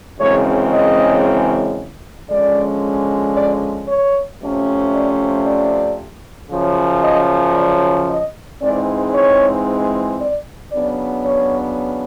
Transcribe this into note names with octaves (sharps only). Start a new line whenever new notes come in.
F#2 C#3 E3 G#3 C4 C#5
D#5
D3 F3 G#3 C#4 D5
D5
C#5
C3 F3 A3 C#4
D5
D5
F#2 C#3 F3
D#5
D5
D#5
G#2 E3 G#3 C4 D5
C#5
D5
C#3 F#3 B3 D4 D5
C#5